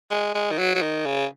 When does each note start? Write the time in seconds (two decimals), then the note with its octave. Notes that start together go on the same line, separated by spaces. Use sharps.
0.11 G#3
0.34 G#3
0.51 D#3
0.58 F#3
0.75 F#3
0.82 D#3
1.05 C#3